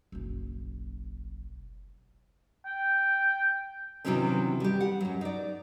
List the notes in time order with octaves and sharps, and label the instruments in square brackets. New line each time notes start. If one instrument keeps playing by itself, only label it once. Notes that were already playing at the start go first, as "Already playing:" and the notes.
[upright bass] F#1 B1
[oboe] G5
[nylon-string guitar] C3 D#3 E3 F#3 C4 C#4
G3 G4
F#5
F#2 F#3
D#4 D5